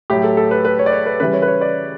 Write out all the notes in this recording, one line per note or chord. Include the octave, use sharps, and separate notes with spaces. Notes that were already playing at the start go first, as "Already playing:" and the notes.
A2 F#3 G4
A4
A4
B4
B4
C#5
D5
C#5
B4
C#3 E3 G3 B4
C#5
B4
C#5
D5